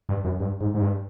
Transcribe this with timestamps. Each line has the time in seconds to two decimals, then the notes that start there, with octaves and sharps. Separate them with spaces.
0.09 G2
0.24 F#2
0.40 G2
0.61 G#2
0.74 G#2
0.81 G2